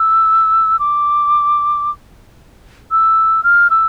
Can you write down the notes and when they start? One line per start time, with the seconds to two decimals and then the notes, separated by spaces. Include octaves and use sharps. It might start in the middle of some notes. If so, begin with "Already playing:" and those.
Already playing: E6
0.79 D6
2.91 E6
3.44 F6
3.70 E6